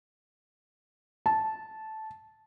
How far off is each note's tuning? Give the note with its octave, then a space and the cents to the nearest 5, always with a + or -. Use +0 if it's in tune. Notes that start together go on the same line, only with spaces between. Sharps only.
A5 -10